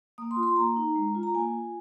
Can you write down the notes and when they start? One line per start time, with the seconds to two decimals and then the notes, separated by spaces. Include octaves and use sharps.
0.18 A#3 D#6
0.31 C6
0.36 F4
0.43 C6
0.56 A#3 A#5
0.76 D#4
0.96 G#3
1.15 F4
1.23 A#5
1.34 A#3 G#5
1.54 F4